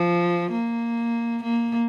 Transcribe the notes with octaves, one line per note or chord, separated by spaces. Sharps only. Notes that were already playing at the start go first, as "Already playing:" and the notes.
Already playing: F3
A#3
A#3